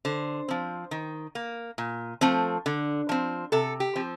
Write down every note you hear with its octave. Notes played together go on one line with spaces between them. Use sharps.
D3 C5
F3 C4
D#3
A#3
A#2
F3 A3 C4
D3
F3 C4
C3 A4
G4
F3 C4